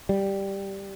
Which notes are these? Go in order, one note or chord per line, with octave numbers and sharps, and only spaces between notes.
G3